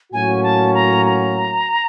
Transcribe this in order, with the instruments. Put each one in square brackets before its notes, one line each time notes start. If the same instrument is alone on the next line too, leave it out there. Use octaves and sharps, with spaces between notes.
[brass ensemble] A2 F#3 A#3 C#4 F#4 [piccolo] G#5
[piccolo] A5
A#5
A#5